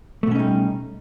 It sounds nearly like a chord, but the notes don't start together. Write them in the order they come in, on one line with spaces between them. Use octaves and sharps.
A3 B2 C#4 D#4 G3